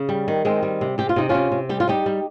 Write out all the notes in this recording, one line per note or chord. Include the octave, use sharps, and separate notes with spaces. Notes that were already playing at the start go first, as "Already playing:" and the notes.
Already playing: C#3
G3
D#3
D#3 G#3 C4
G3
C3
C3 G4
F4
C3 D#4
C3 C#4 F4
C3
G3 G4
F4
G3 D#4 G4
G3